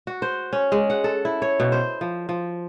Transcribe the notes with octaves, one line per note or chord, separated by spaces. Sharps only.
F#4
C5
C#4
G#3
F#5
A4
E4
C#5
B2
C5
F3
F3